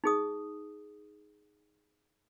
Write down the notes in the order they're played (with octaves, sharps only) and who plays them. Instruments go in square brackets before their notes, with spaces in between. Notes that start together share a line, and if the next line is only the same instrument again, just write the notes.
[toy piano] D#4 G#4 D#6